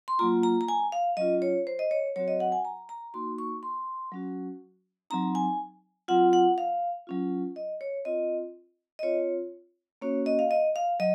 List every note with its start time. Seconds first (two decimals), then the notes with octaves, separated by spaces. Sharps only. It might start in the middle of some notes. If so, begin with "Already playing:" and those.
0.08 C6
0.19 F#3 A#3 F4 A#5
0.43 A#5
0.61 A#5
0.68 G#5
0.92 F5
1.17 F#3 C#4 F4 D#5
1.42 C#5
1.67 C5
1.79 D#5
1.91 C#5
2.16 F#3 C4 F#4 C#5
2.28 D#5
2.40 F#5
2.52 G#5
2.65 A#5
2.89 A#5
3.14 A#3 D#4 F#4 C6
3.38 C#6
3.63 C6
4.12 F#3 C#4 F#4
5.10 F#3 C4 D#4 A#5
5.35 G#5
6.08 F#3 C4 F4 F#5
6.33 F#5
6.58 F5
7.07 F#3 C#4 F4
7.56 D#5
7.81 C#5
8.05 C4 F4 D#5
8.99 D#5
9.03 C4 F4 C#5
10.01 A#3 C#4 F#4 C#5
10.26 D#5
10.39 F5
10.51 D#5
10.76 F5
11.00 F#3 D#5